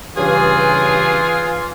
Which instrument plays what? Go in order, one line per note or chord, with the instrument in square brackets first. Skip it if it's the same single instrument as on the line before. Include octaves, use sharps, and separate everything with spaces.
[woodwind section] G2 C#3 [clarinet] E3 [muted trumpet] F4 [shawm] G#4